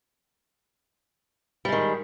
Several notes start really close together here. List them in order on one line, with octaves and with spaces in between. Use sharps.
G3 G#3 D#3